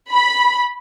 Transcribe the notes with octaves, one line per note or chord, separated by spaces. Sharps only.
B5